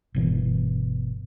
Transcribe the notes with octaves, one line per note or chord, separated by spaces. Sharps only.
G1 B2 E3